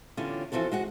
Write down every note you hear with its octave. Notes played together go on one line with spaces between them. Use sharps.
E2 D3 C#4 F4 G4
E3 F3 C4 F#4 A4
G#3 F#4 F#5